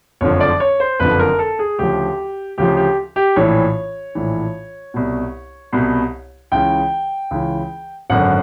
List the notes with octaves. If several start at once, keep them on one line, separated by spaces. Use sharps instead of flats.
F#1 F2 D3 F3 C#5
D5
C#5
C5
F#1 F2 D3 F3 B4
A#4
A4
G#4
D2 C#3 F3 G4
D2 C#3 F3 G4
G4
G4
A#1 A2 E3 C#5
A#1 A2 E3
C2 B2
C2 B2
C#2 C#3 E3 G5
C#2 C#3 E3
G#1 F#2 D3 F#5